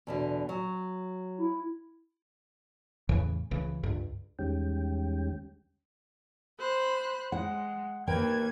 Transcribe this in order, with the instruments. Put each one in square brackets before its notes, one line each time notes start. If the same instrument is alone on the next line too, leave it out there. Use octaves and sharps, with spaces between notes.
[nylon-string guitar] E2 B2 D3
F#3
[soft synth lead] E4
[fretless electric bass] E2 A2 C#3 E3
C#2 C#3 E3
C#2 G2
[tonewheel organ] E2 D#3 G3 G#3 C#4 G5
[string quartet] C5 B5 F#6
[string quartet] G#3 [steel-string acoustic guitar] F#5
[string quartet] D#2 G#6 [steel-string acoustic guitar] A#4 B4 G5